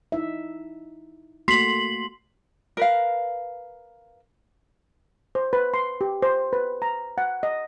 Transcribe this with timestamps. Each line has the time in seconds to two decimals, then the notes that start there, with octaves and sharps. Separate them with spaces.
0.12 D#4 E4 E5
1.48 A3 A#3 F#4 C6 B6 C7 F#7
2.77 A#4 B4 F5
5.35 C5
5.53 B4
5.74 C6
6.01 G4
6.22 C5
6.53 B4
6.82 A#5
7.18 F#5
7.43 D#5